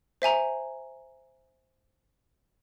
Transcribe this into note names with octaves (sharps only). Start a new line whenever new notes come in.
C5 E5 G#5 A#5